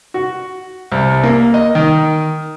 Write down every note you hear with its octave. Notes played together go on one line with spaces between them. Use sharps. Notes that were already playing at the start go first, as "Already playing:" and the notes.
F#4
C2
A#3
D#5
D#3